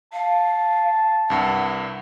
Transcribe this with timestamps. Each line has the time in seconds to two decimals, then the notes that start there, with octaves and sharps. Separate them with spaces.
0.13 F5 A5
1.30 C2 G2 F#5